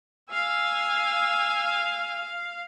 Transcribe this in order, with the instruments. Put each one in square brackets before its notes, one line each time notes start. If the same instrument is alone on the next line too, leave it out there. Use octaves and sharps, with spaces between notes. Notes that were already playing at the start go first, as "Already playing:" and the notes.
[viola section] F5 [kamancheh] G#5 E6